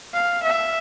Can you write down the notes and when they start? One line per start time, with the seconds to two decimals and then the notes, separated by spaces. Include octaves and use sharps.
0.14 F5
0.43 E5